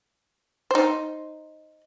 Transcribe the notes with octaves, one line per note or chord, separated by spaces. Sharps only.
D#4 C5